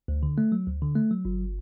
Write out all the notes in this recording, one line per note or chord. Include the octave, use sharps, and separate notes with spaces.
D2
D3
A3
F#3
D2
D3
A3
F#3
G1